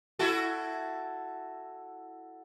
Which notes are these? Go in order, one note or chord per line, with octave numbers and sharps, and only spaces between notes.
E4 F#4 A4